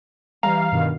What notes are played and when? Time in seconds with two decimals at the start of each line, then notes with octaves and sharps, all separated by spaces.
0.43 E3 G3 F5 A#5
0.72 G2 B2 D#3